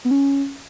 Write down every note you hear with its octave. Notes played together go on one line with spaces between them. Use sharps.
B3
C#4